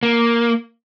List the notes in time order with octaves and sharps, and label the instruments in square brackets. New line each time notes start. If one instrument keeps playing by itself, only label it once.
[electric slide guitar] A#3